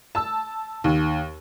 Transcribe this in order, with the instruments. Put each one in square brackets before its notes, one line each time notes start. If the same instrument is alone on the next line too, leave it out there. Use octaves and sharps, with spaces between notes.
[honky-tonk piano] A5 E6
D#2